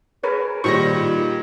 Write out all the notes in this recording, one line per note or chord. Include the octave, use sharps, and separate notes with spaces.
G#4 A#4 B4 C#5
A#2 D#3 G3 C5 C#6 A#6